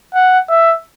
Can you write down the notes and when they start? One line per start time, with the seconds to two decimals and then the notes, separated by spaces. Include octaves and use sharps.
0.14 F#5
0.50 E5